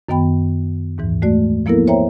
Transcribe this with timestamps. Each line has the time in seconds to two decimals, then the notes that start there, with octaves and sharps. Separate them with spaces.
0.09 F#2 D#3 B3 G5 B5
0.98 D#2 G#2 E3
1.22 G#3 A3 F#4 D5
1.66 F3 A#3 B3 E4 A4 A#4
1.87 C5 C#5 E5 G5 A#5